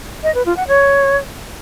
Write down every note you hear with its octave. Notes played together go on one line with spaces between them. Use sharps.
D#5
B4
F4
F#5
C#5